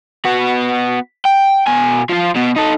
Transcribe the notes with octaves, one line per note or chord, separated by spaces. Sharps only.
B3 F#4
G5
B2 G#5
F3 F4
B2 B3
D#4 A4